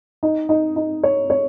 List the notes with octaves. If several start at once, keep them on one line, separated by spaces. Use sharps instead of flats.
D#4
D#4
D#4
C#5
C#5